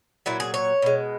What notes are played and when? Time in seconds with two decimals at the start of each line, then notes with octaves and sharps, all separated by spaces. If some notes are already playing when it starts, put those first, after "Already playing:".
0.26 A#2 F#3 E4
0.40 G#4
0.54 C#5
0.82 B2 G#3